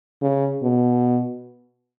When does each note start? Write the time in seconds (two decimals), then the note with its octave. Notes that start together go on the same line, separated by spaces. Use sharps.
0.22 C#3
0.63 B2